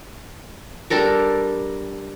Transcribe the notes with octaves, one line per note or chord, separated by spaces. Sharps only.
G3 D4 A4 A#4